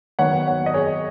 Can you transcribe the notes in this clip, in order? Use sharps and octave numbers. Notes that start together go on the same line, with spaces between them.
D#3 F#3 B3 D#4 C#5 F#5
C#5 F#5
D#5
G#4 C#5